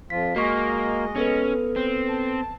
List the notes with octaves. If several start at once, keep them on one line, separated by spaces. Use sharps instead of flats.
F2 F3 F4 B6
G#3 A#3 F#4 D#5 C#6
B3 C#4 A4 B4
C4
A5